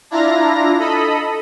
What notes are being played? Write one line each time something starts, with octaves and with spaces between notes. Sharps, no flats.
D4 E4 F4 A#5 A#6
A4 D#5 B5